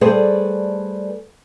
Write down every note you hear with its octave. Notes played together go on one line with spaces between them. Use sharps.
G3 A3 G#4 B4 C5 D5